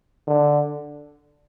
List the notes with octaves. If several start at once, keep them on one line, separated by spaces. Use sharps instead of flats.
D3